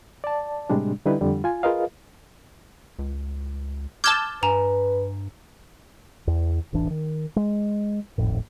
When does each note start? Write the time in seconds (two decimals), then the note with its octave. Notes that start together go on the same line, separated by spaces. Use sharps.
0.24 D5 A5
0.70 A2 C3 G3 G#3 D4
1.06 D3 G3 D#4 E4 B4
1.21 F2 D3 G3
1.44 F4 G#5
1.63 F4 G#4 A#4 B4 D#5 F5
2.99 C#2
4.04 A5 D6 E6 F6 G6 G#6
4.43 G2 B4 G#5 A#5 E7
6.27 E2
6.73 D#1 A1 E3 D4
6.90 D#3
7.36 G#3
8.18 D#1 G#1 F2 A2